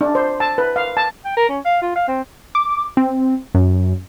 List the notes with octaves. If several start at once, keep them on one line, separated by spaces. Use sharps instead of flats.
D4
C5
A5
B4
F5
A5
G5
A#4
C#4
F5
F4
F5
C4
D6
C4
F#2